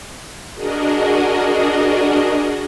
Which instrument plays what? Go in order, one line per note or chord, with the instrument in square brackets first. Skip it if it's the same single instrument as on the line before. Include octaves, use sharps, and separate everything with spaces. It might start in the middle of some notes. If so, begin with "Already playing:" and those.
[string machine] D4 F#4 G#4 A#4 D#5